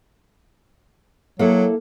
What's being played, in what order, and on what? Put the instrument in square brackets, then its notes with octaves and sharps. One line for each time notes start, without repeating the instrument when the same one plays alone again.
[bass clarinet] F#3 [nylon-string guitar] A#3 E4 A4